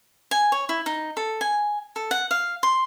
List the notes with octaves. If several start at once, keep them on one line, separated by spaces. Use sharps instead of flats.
G#5
C#5
E4
D#4
A4
G#5
A4
F#5
F5
C6